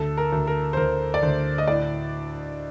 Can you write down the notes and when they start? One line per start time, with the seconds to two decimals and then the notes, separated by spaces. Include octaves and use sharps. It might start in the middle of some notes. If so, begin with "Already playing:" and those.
Already playing: D2 A4
0.17 A#4
0.33 D2
0.47 A#4
0.73 C5
0.77 D2 A#4
1.14 D5
1.23 D2 C5
1.58 D#5
1.68 A2 D5